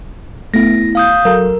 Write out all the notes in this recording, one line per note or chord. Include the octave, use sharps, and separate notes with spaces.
A3 B3 E4 A#6
F5 D#6 G6
F#3 A4 A#4 F5